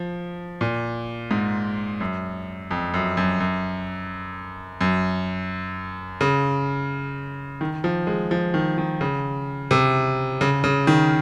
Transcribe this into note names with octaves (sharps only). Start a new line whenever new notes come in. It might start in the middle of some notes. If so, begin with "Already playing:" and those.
Already playing: F3
A#2
G#2
F#2
F2
F#2
F#2
F#2
F#2
C#3
D#3
F3
G#3
F3
D#3
D#3
C#3
C3
C#3
C#3
D#3